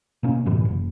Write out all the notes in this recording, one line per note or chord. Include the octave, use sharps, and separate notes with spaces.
B2 A#3 C#4
F#2 A2 C3 E3
F#1